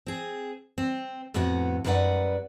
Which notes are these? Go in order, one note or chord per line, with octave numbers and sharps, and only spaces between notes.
C4 G#4
C4
F2 A2 B3 F#4 F#5
F#2 G3 D#4 B4 D5 F#5